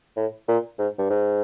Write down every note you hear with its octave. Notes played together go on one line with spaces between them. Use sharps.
A2
A#2
G#2
G2
G#2